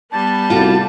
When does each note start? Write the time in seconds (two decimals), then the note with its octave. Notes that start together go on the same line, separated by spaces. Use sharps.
0.12 G3 B3 A5
0.50 C2 F4 F#4 A4